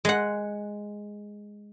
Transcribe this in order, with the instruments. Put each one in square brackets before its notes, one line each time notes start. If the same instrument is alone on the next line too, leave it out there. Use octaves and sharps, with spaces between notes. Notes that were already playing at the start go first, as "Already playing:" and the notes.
[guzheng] G#3 F#5